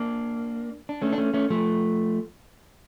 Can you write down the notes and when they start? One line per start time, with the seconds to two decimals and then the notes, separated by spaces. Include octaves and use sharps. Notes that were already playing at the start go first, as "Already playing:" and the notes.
Already playing: A#3 D4
0.89 D4
1.02 A3 C#4
1.13 D4
1.18 A3 C#4
1.34 A3 C#4
1.50 F3 A3